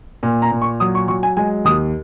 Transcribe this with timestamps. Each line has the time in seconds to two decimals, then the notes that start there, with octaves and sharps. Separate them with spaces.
0.23 A#2
0.42 A#5
0.51 A#2
0.62 C#6
0.80 F#3 D#6
0.95 C#6
1.08 F#3 C#6
1.23 G#5
1.37 G#3 G#5
1.65 D#2 D#6